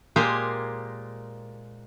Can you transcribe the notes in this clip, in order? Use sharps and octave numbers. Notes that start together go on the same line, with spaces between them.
A#2 G#3 A#3 G4 C5 G#5